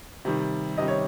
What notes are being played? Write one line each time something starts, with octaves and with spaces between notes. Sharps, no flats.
C3 D#3 G3
C3 D#3 G3 D#5
C#5